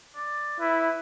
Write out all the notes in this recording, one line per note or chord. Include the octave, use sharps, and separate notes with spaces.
D5
E4 B4